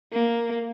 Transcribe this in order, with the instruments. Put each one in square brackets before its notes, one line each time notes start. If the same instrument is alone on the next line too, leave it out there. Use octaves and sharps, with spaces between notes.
[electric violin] A#3